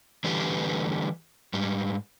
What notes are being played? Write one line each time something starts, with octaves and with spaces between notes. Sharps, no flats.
D3 E3 G3 A3 G4 B4
G#2 G3